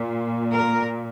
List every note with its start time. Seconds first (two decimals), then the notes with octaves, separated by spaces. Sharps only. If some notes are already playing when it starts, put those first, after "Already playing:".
Already playing: A#2
0.53 A#4